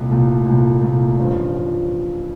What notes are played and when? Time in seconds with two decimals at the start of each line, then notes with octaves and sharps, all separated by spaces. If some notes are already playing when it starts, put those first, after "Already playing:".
Already playing: C2 A#2 A3
0.11 C2 A#2 A3
0.46 C2 A#2 A3
0.82 C2 A#2 A3
1.19 A1 G2 F3
1.56 F3